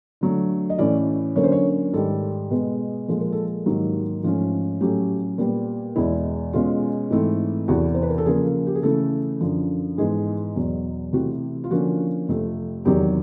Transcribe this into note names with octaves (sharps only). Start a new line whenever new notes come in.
D3 F#3 A3
D#5
A2 E3 A3 C#4 D5
D3 F#3 A#3 C#4 C#5
C5
C#5
G#2 D#3 G3 A4
B2 G#3 B3
A#2 F3 G#3 A4
A#4
A4
G#2 D#3 F#3 A#3 G4
G#2 F3 A3 C#4
A2 F#3 A3 C#4 G4
A#2 G3 B3
E2 B2 G#3 E4
B2 G#3 C#4 F4
G#2 E3 A3 C4
E2 C3 E3 F#4
C5
B4
A#4
A4
C#3 F3 A#3 G#4
G4
G#4
C#3 E3 A3 A4
F#2 D3 F3
G#2 E3 G#3 B3 G#4
E2 B2 F#3
C3 E3 A3 C4 F#4
F4
D3 F3 A#3 C#4 F#4
F2 C3 F3 A3
E2 C3 D#3 F#3 G4